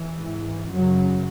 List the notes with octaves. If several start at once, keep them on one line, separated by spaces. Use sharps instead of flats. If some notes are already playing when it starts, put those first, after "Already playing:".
Already playing: E3
G#2
F#2 C#3 F#3